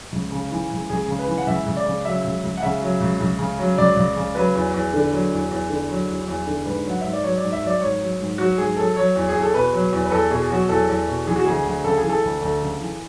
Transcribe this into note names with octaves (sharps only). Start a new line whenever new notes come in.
C#2
C#3
E3
C#2
C#2 G#4
C#3
B4
E3
F#5
C#2 E5
C#2
D5
C#3
F#3 E5
C#2
C#2
F#5
C#3 E5
F#3
C#2
C#2
C#3
F#3
C#2 D5
C#2
C#3
F#3 B4
E2
E2
D3
F#3
E2
E2
D3
F#3
E2
E2
D3
G#2 B4
F#3
F#5
G#2 E5
D5
F#3 C#5
D5
G#2
E5
F#3 D5
G#2 C#5
F#3
G#2
F#3 F#4
G#2 G#4
F#3 A4
F#3 C#5
E2
G#4
E2
A4
B2 B4
F#3
E2
B4
E2 A4
B2 G#4
F#3 F#4
E2 A4
E2
B2
E3 G#4
F#4
D2 G#4
D2
C#3 A4
G#4
E3
A4
D2
D2 A4
C#3
E3